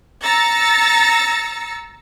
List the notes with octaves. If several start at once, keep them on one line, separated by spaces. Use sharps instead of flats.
A#5 E6 A6 A#6 C#7